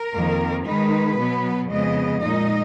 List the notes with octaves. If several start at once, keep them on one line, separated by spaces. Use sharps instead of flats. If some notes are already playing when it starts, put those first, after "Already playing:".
Already playing: A#4
F2 D#3 A#3
D#3 G#3 D#4 B4
B2 F#3 B3
F2 C#3 G#3 B3 D#5
A#2 G#3 D#4 D#5